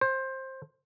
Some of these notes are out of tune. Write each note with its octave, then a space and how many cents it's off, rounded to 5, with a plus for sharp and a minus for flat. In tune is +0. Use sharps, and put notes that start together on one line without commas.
C5 +15